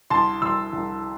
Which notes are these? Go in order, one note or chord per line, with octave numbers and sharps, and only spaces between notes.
C2 A5 C6
C2 C6 E6
C2